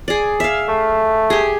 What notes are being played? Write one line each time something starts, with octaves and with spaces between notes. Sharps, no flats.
G#4 D5
E5 F5
A3
G4 G#4